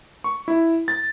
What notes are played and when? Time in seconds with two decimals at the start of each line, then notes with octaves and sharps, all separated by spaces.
0.24 C#6
0.48 E4
0.88 A6